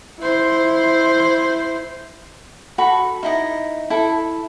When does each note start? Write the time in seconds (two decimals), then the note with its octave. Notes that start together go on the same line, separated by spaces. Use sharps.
0.19 E4 C5
2.78 F#4 A4 B5
3.23 D#4 E4 D#5
3.90 E4 A4